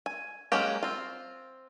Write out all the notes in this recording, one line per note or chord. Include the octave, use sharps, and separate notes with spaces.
G#5
F#3 G#3 A#3 C#4 G4
C4 F4